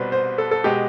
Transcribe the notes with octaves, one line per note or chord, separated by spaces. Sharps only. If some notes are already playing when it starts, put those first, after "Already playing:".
Already playing: C2 B2 G3 B4 C5
C5
A4
A4
B2 G#3 G4